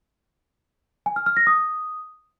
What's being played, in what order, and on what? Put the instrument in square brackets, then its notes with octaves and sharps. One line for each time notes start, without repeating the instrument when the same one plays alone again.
[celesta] G#5
F6
F6
A#6
D#6